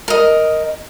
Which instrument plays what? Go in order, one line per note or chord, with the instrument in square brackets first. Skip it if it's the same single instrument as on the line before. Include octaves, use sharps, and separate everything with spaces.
[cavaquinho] A#4 D#5